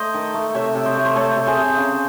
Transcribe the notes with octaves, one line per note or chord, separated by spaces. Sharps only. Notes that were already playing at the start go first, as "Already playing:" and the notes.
Already playing: A3 C5 D#5
D#3
A3
C3 C#5 E5
C3
C5 D#5
A3
C5
A3 A4 C#5
C3
G#4 C5
C3
C#3